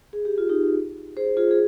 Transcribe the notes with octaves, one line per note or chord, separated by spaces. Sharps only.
G#4
G4
F4
D#4 G4
G#4 C5
F4 G#4
G#4